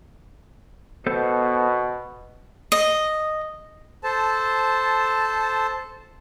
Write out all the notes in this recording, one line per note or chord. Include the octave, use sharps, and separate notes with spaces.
B2 B3 A4 C5
D#5
A4 C5 A5